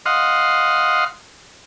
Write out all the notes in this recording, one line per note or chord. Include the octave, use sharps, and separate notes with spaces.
D#5 F5 F#5 C6